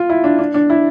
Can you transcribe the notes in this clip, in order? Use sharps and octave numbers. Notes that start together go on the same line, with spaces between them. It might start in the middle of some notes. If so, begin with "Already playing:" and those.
Already playing: F4
E4
D4
D4
D4
E4